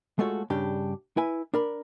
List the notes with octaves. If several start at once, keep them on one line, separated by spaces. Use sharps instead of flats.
G#3 A3 F4 F#4 A4 C#5
G2 C#3 D4 G4
E4 B4 G#5
D4 A#4 B5